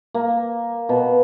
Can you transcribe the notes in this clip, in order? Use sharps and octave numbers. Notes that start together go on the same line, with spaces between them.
A#3
B2